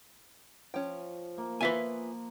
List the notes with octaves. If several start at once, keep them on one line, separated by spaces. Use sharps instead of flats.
F3 C#4 G5
A#3
B3 F4 B4 E5 G#5